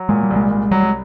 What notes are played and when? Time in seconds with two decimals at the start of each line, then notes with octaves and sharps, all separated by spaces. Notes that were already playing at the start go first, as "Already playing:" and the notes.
Already playing: F#3
0.09 A#2 G#3
0.23 G3
0.30 C2
0.36 G#3
0.51 C2
0.71 F#3 G3
0.83 G#3